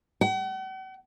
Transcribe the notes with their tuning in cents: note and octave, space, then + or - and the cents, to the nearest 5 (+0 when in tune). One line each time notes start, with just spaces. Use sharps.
F#5 +45